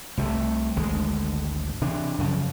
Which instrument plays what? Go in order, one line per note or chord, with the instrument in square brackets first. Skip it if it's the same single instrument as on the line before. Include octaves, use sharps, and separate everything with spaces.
[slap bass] C2 C3 G#3 A3
G#1 D2 D3 G#3
C3 E3 D4
F#2 C#3 F3